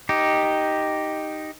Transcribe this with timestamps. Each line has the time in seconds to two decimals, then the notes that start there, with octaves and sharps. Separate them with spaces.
0.09 D#4 G4